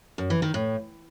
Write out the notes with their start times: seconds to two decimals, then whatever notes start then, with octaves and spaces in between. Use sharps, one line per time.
0.18 F#2
0.30 E3
0.42 D#3
0.54 A2